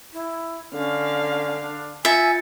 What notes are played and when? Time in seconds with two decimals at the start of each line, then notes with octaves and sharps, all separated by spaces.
0.13 E4
0.74 D3 C#4 F5
1.60 D4
2.05 F4 E5 G#5 A6 C#7